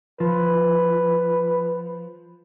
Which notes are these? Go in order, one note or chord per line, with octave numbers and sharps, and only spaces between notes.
F3 B4